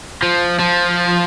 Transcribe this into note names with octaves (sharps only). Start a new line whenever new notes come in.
F3
F3